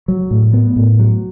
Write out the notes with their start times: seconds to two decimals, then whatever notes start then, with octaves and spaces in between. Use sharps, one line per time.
0.08 F#3
0.31 A2
0.53 B3
0.76 A2
0.99 F#3